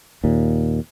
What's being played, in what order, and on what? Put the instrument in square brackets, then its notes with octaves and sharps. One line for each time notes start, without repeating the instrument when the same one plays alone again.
[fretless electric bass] D#2 A#2